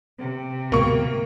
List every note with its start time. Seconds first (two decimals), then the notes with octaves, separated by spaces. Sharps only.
0.19 C3
0.72 D2 G#2 B2 A#3 C#6